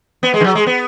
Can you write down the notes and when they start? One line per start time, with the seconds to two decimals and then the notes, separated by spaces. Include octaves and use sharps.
0.23 B3
0.34 G#3
0.41 D#3
0.44 F#3
0.55 G#3
0.67 B3